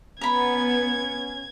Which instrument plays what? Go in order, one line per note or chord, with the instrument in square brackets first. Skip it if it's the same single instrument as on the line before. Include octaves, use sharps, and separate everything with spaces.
[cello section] B3 [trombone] C#4 [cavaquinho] A#5 B5 [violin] G#6